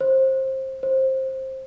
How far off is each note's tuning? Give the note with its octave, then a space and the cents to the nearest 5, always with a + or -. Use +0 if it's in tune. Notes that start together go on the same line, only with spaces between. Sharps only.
C5 +20
C5 +15